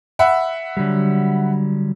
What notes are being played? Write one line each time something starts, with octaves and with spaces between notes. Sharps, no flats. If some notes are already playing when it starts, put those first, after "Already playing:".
E5 F#5 B5
D3 F#3 G3